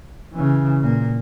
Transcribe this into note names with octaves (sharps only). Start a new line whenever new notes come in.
C#3 E3
A#2 A#3